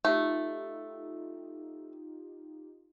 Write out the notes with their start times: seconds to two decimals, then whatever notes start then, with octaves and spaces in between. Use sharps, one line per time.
0.05 A3 D#4 F4 G4